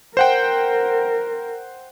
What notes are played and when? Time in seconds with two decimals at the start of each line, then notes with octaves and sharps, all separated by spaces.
0.17 A#4 C5 F#5 G5